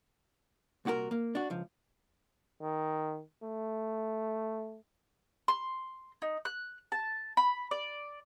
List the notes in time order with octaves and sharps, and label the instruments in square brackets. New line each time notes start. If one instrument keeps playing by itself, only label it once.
[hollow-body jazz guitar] C2 A#2 F#4 G4 A#4
A#3
D4 F#4
C#2 F3
[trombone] D#3
A3
[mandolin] C6
D#4
F#6
A5
B5
D5